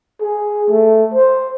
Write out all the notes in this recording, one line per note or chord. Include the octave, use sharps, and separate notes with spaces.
G#4
A3
C5